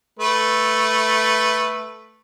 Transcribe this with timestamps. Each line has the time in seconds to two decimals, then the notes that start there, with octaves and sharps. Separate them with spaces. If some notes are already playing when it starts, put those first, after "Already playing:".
0.19 A3 B4